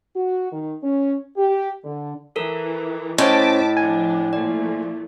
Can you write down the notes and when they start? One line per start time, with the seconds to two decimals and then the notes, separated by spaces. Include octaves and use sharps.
0.15 F#4
0.52 D#3
0.83 C#4
1.36 G4
1.84 D3
2.36 E3 A4 A#4
3.18 A2 C#4 C5 C#5 D#5 A5 D6 B6
3.77 F3 D4 G#5
4.33 A#2 F3 A3 D5